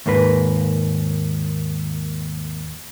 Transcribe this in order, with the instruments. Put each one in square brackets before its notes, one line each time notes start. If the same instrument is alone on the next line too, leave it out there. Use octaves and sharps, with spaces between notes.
[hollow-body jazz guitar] D#2 G#2 A#3 B4